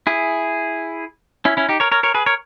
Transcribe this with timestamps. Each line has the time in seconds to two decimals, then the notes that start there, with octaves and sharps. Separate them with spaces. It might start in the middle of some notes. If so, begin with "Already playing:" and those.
0.07 E4 G#4
1.45 C#4 E4
1.57 C#4 E4
1.69 D#4 G4
1.80 A#4 C#5
1.92 A#4 C#5
2.03 A#4 C#5
2.14 G#4 B4
2.26 A#4 C#5